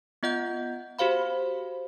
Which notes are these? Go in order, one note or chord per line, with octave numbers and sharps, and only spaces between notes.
B3 F4 D#5 F#5 G6
F#4 G4 C5 F5 B5